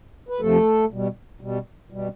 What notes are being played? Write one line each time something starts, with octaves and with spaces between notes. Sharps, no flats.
B4
F2 C3 F3 A3 A4
B2 G3
B2 G3
B2 G3